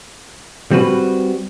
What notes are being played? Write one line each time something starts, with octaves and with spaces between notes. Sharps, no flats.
G3 C4 F#4 B4